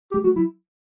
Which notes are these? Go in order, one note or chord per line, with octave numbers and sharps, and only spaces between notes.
G4
G#3
G3 A3 F#4
F#3 E4